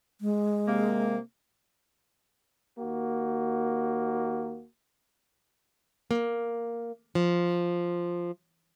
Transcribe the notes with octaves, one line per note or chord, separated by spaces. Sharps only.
G#3
C3 A#3
D#2 A#3 F#4
A#3
F3